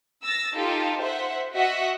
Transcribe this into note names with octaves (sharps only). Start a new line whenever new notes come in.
E6 A6 A#6
D#4 F4 G4 A4
C5 E5 F#5
F#4 D#5 E5 F#5